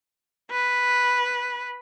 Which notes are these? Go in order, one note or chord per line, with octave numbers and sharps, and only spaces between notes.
B4